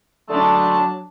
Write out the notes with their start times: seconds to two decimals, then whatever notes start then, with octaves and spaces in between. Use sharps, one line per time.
0.30 D3 F#3 G#3 A3 D4 A5